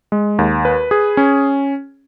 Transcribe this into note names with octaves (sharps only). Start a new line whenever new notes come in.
G#3
D#2
B4
G#4
C#4